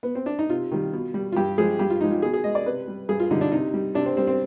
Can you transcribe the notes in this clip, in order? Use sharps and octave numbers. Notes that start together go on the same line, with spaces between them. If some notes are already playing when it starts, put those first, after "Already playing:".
B3
C4
D4
D#4
C3 F4
D#3 G3
B2
G3
F4
G2 G4
F3 G#3 G#4
G2 G4
F4
F3 G#3 D#4
F4
B2 G#4
G#4
G#3 D#5
D5
C3 B4
G3
G2 G#4
F4
D3 G3 D#4
D4
C3 D#4
G3
C3 D4
C4
G3 C4
C4